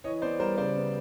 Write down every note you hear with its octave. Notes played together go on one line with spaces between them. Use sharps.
E3 C#5 D#5
B3 C5 D5
G3 A#4 C5
C#3 C5 D5
B3